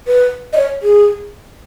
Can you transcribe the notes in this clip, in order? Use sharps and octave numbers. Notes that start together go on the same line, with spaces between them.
B4
D#5
C#5
G#4